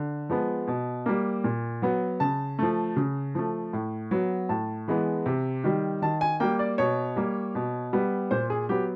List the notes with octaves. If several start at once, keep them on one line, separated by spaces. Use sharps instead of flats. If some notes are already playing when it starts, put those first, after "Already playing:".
Already playing: D3
F3 G#3 B3
B2
G3 A#3
A#2
F#3 B3
C#3 A5
F3 A3
C#3
F3 A3
A2
F#3 B3
A2 A5
E3 G#3 B3
C3
D#3 G3
D#3 A5
G#5
G3 A#3 G5
D5
B2 C#5
G3 A#3
B2
G3 B3
A#2 C5
G#4
F#3 B3 G4